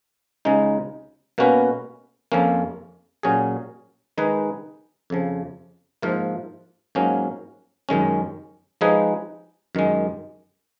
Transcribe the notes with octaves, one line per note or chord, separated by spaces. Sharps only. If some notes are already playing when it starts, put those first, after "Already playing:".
C#2 C#3 G#3 D#4
B2 A#3 C#4 F#4 B4
F2 F3 A#3 C#4
A#2 F#3 C#4 G#4
D#3 G#3 D#4 G#4 B4
F2 C#3 F3
G#2 F3 A#3 F4
G#2 F#3 A#3 C#4
F#2 D#3 G#3 C#4
F3 G#3 D#4 G#4 B4
F#2 D#3 G#3